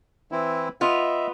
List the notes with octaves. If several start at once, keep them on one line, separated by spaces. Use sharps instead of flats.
E3 C4 E4
B3 F4 D#5 E5